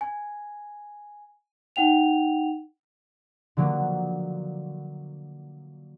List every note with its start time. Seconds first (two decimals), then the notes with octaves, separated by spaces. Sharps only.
0.01 G#5
1.76 D#4 F#5 G5 F7
3.57 D3 F3 F#3 A#3